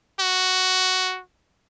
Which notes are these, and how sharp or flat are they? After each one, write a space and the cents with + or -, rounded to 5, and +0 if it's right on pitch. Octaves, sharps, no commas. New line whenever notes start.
F#4 +5